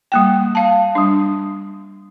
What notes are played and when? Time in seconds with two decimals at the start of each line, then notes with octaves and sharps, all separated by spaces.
0.12 G3 A#3 G5
0.55 F5 A5
0.95 G3 D4